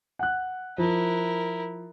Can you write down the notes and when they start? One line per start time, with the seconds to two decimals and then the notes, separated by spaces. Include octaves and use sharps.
0.19 F#5 F#6
0.78 F3 E4 A#4